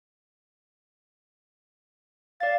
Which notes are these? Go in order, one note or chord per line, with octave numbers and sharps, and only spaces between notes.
D5 F5 A6